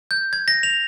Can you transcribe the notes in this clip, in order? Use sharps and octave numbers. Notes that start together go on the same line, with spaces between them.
G6
G#6
A#6
F7